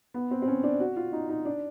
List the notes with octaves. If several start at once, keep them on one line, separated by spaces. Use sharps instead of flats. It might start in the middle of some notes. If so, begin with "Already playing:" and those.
B3
C4
C4
C#4
D4
F#4
F4
D#4
D#4
D4